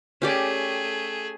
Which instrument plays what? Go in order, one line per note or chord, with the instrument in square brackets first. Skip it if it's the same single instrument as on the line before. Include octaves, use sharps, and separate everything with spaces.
[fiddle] A3 G#4 [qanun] C#4 G4 D5